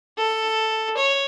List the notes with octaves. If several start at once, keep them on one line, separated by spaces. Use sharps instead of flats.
A4
C#5